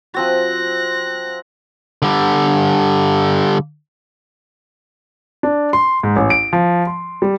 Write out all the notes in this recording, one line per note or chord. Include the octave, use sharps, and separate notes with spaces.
F3 C4 F#4 F#6 A#6
D3 G3
D4
C6
G#2
A1
D7
F3
C6
G3